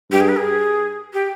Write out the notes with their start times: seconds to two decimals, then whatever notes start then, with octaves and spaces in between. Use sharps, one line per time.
0.11 G2 G4
0.20 G#4
0.28 B4
0.36 G#4
1.13 G4